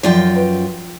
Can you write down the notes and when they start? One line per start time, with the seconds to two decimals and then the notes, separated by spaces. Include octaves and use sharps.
0.03 F#2 F3 F4 D5 G5
0.36 B4